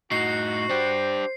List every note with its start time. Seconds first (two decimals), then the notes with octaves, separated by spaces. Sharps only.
0.12 A2 D#4 F#4 C7
0.69 D4 G4 C5